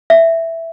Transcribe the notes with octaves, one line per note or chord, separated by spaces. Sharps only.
E5